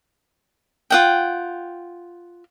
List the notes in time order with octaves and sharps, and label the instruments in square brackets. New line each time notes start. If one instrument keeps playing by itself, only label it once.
[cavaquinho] F4 F#5 G5